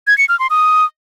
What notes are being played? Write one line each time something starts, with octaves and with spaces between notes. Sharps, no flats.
G#6
C#7
F6
C6
D#6